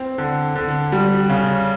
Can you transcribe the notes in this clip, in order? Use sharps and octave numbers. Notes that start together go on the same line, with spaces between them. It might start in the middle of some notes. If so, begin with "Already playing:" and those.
Already playing: C4
D3
D3
G3
C#3